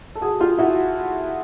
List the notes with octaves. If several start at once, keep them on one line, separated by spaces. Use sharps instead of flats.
A4
F#4 G#4
F4 G4
E4 F#4